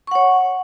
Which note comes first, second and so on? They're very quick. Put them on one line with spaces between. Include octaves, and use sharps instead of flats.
C#6 F#5 C#5